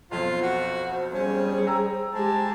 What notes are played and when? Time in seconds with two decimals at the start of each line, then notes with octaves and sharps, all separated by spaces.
0.11 B1 F2 F4 C5
0.42 F#4
1.14 G3 C#4 G#4
1.66 G5 A#5 E6
2.14 G#3 G4 A5